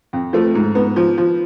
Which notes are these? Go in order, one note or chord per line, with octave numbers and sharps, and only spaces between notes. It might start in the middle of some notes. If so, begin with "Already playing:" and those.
F2
F3 A3
G#2
G#2 B3
F3
F3